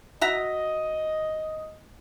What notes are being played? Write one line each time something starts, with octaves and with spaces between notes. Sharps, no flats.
F#4 D#5 E5 A#5